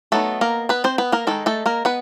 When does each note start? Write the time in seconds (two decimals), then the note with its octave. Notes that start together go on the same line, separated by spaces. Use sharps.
0.12 F#3 A3 B3 D#4 A4
0.41 A#3 A#4
0.69 B3 B4
0.84 C4 C5
0.98 B3 B4
1.12 A#3 A#4
1.27 D#3 G#3 D#4 A4
1.46 A3 A4
1.66 A#3 A#4
1.85 B3 B4